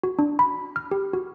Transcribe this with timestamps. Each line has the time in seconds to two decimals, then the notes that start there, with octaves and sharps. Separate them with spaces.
0.03 F#4
0.19 D4
0.39 B5
0.76 F6
0.91 G4
1.13 F#4